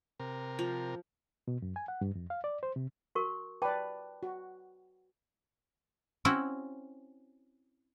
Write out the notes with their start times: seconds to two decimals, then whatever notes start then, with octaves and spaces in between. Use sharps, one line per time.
0.20 C3 A#4
0.59 F3
1.48 B2
1.62 F#2
1.76 G#5
1.88 F#5
2.01 G2
2.15 F2
2.30 F5
2.44 D5
2.63 C5
2.76 C3
3.15 F#4 A#4 C#6
3.62 B4 D5 G5 A5 D6
4.23 F#4
6.25 C4 C#4 E4 F#4